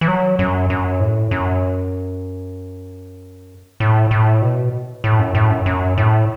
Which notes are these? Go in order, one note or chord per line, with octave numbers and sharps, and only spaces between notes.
E3
F#3
F#2
F#2
A2
F#2
A2
A2
B2
A2
F#2
A2
F#2
F#2
A2